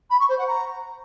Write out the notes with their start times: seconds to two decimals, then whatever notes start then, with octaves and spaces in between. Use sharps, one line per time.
0.10 B5
0.19 C#6
0.29 C5
0.38 F#5
0.47 A#5